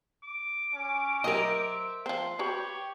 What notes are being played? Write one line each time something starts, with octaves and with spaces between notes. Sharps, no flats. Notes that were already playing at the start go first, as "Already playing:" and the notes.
D6
C#4
F#3 G4 A#4 C5 D#5 E5
F3 C4 C6
F#4 G4 B4 C#5 D5